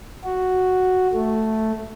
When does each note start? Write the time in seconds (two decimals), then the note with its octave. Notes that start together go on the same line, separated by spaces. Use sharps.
0.24 F#4
1.13 A3